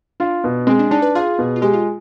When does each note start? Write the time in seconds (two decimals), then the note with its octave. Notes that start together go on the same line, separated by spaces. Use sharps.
0.20 D4 F4
0.44 B2
0.67 G#3 C4
0.79 D4
0.91 D4 D#4
1.02 B4
1.15 F4 G#4
1.39 B2
1.56 F4
1.62 G#3 G4
1.73 F4